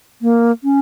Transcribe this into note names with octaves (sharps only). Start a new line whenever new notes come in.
A#3
C#4